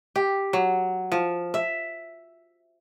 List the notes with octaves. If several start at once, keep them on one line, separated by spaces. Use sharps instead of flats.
G4
F#3
F3
E5